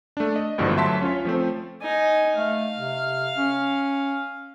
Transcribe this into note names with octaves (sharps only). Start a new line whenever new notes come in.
A3 D4
D#5
G#1 D2 G2 B2 E3 F3
D2 F#3 E5 A5 C6 B6
C#4 F4 C#5
F3 A3 C4
D#4 G#5
A3 F5
C3
C#4